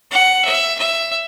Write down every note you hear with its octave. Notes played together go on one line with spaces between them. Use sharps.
F#5
E5
E5